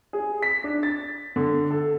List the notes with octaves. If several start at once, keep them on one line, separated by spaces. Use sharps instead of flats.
G#4
B6
D4
A6
D3
A4